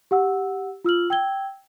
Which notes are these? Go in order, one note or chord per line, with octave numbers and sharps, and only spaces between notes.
G4 F#5 E6
F4 E6 F6 F#7
G5 E6 G#6 G7